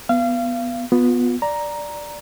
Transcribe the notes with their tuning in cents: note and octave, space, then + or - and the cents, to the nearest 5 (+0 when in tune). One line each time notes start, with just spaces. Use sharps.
B3 +0 F5 -30
B3 +0 F4 +35
D5 +0 A#5 +5